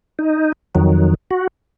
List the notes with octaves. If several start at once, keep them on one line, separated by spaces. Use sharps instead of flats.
D#4
F2 D#3 F#3
F#4